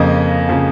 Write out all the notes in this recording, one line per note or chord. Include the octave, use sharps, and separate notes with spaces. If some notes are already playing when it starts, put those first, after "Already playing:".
Already playing: F2 C#3 F3 A#3 D#5
C#3 F3 A#3